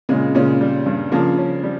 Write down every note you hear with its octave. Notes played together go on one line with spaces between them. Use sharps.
A#2 C#3 G#3
A#2 C#3 C#4
G3
G2
C#3 F3 A#3
C#4
G3